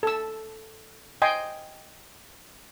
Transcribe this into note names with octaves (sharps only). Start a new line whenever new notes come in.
A4 E6
D#5 G5 G#5 C6